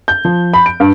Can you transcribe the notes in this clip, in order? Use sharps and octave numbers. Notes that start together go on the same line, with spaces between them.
G6
F3
B5
D7
G2